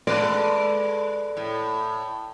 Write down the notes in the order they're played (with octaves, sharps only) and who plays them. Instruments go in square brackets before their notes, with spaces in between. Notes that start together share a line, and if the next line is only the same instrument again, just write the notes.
[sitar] G#3 A4 B4 [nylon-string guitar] D5
[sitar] A2